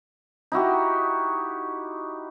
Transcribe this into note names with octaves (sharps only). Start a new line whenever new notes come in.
D#4 E4 F#4 G4